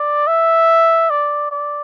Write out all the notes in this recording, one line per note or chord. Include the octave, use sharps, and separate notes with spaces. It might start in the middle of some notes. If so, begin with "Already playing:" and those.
Already playing: D5
E5
D5
D5